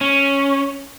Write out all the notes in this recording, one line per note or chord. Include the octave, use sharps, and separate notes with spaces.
C#4